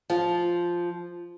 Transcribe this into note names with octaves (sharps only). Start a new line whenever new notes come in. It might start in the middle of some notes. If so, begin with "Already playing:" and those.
F3 F4